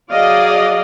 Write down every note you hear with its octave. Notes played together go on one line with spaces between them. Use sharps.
F#3 G#4 D5 D#5 F5